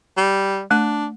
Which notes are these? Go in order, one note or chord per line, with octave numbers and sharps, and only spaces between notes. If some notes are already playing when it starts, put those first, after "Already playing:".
G3
A3 D4